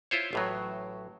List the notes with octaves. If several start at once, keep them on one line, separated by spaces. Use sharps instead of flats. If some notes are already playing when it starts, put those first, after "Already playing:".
E4 F4 C5 C#5
A1 A2 F#3